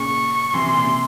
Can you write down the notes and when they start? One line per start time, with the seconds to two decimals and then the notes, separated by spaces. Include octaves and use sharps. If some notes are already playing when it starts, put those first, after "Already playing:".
Already playing: A#2 C#3 C#6
0.54 C3 E3 C6
0.64 C3
0.74 A#2
0.84 C3